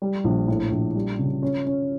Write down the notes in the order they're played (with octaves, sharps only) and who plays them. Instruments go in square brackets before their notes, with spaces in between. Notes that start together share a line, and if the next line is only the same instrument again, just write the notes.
[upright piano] G3
A#1
A2
A#1
G3
C#3
C#4
C#4